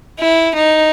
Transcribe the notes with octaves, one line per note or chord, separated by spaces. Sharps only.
E4
D#4